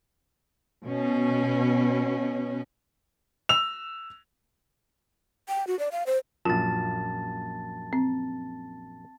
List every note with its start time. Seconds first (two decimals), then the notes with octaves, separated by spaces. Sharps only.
0.84 B2 C#4
3.49 E6 F7
5.49 G5
5.67 F#4
5.79 D5
5.92 F5
6.07 C5
6.45 A#1 F#2 F4 A5 A6
7.93 C4